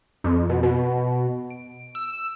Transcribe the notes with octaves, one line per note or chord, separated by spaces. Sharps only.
F2
B2
B2
D7
E6